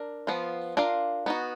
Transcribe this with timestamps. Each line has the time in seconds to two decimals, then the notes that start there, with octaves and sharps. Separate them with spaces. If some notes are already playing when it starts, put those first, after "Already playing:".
Already playing: D4 A#4
0.27 F3 B3 F4
0.77 D4 F4 A#4 F5
1.26 B3 D#4 F#4